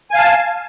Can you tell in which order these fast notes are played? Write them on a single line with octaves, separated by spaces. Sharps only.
G#5 F5 A5